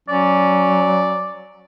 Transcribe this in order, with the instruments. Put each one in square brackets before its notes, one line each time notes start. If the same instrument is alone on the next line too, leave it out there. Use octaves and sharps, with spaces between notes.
[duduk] F#3 [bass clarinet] C#4 [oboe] D5